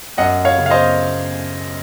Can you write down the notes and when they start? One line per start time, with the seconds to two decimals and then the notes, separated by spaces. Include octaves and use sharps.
0.18 F#2 D#5 F#5
0.45 C#5 F5
0.58 C#3
0.66 F5
0.70 C5 D#5